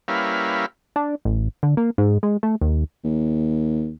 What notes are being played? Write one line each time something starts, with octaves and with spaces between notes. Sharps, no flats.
G3 A#3 C#4 E4 B4 F5
D4
A1
D3
A#3
G#2
G#3
A3
D#2
D#2